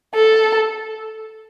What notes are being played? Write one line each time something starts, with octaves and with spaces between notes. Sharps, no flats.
A4